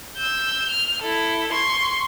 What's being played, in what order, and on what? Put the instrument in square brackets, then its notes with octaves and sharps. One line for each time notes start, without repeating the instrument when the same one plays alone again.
[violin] E6 G6
F6
E4 A4
C6 C#6